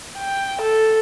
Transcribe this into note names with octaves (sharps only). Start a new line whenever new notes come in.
G5
A4